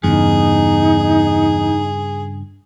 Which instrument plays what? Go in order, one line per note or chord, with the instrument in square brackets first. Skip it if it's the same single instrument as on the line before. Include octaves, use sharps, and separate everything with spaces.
[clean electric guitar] E2 [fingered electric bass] G2 C#3 [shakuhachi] D#4 [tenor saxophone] G#4